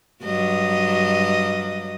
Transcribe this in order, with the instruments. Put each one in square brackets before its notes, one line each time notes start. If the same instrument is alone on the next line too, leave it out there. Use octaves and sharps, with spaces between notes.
[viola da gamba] G2 F#3 D#5